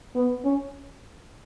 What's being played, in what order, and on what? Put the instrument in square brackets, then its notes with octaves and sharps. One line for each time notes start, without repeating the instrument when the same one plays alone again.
[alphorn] B3
C#4